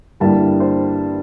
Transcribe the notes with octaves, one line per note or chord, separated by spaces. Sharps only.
G2 D3 G3 A#3 E4 A5
C5